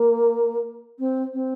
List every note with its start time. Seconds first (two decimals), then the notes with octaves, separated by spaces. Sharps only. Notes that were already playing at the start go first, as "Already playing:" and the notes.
Already playing: A#3
0.98 C4
1.33 C4